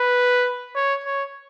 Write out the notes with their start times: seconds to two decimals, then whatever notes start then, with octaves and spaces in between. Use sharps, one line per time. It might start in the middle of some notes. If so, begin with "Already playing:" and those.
Already playing: B4
0.75 C#5
1.04 C#5